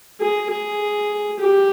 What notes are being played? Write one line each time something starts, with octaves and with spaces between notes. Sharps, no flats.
G#4
G#4
G4